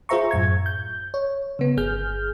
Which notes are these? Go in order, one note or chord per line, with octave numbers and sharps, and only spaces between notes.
F4 G#4 C5 E5 A#5 C#6
F#2 A2 C#6 G#6
G6
C#5
C#3 B3
G1 G#4 F6 G6